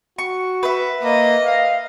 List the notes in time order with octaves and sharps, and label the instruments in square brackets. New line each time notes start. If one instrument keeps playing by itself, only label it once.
[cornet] F#4 [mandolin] C#6
[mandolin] B4 E5
[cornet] A#3 [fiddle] D#5
[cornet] F5